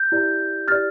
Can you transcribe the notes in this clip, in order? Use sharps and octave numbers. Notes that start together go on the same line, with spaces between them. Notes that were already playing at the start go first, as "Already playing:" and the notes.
Already playing: G6
E4 G4 D5
E4 G4 D5 F6 A6